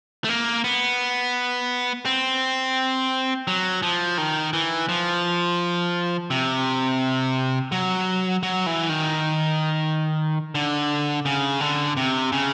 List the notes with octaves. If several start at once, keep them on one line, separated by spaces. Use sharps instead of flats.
A3
A#3
B3
C4
F#3
F3
D#3
E3
F3
C3
F#3
F#3
E3
D#3
D3
C#3
D3
C3
C#3